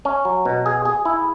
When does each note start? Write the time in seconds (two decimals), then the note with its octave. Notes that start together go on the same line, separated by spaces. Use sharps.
0.05 C#4
0.25 F#3
0.45 B2
0.66 G#4
0.85 G#4
1.05 E4